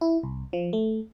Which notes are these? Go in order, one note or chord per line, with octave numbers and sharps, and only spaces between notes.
E4
C2
F3
A3